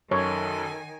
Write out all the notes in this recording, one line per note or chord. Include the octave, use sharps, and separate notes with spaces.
F#2 D#3 A4 C#5 G#5